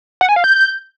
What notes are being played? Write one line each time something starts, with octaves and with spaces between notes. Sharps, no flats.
F#5
G#5
F5
G6